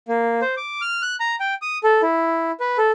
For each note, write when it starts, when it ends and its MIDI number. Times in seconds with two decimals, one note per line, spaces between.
0.08 0.40 58
0.42 0.55 72
0.57 0.81 86
0.81 1.02 89
1.02 1.16 90
1.20 1.36 82
1.40 1.54 79
1.62 1.78 87
1.84 2.01 69
2.02 2.51 64
2.60 2.77 71
2.78 2.92 69